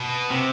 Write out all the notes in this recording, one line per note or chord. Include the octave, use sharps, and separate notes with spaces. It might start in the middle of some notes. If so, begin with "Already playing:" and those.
Already playing: B2
C3